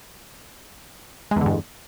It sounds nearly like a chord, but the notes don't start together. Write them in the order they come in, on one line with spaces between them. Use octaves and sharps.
G#3 E2 D3 G2